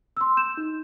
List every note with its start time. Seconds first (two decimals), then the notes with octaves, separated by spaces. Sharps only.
0.17 C6 E6
0.37 G6 E7
0.57 D#4